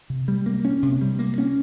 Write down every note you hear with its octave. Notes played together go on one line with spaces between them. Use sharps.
C3
G3
A#3
C#4
C3
G3
A#3
C#4